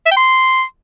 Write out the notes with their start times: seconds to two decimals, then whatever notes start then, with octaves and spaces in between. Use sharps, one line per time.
0.06 E5
0.11 G5
0.17 C6